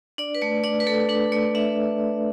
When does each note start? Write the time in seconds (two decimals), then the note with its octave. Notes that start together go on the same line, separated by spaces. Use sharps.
0.18 D4 D5
0.35 B4
0.42 A3 D5
0.64 D4 D5
0.80 B4
0.87 A3 A4
1.09 D4 B4
1.32 A3 D5
1.55 D4 E5